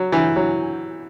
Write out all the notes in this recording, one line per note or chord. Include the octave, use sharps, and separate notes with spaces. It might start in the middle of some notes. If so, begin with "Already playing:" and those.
Already playing: F#3
E3
F#3